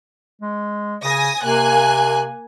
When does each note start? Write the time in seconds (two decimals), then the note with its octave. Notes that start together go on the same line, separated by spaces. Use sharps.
0.42 G#3
1.04 C#3 G#5 D#6 A#6
1.44 C3 A#3 G#5 F#6